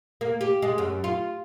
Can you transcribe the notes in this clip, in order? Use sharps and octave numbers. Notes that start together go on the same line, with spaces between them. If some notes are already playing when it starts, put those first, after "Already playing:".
A#3
G4
G#3
F#2
F4